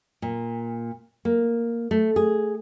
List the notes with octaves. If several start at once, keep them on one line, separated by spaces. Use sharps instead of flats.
A#2
A#3
A3
G#4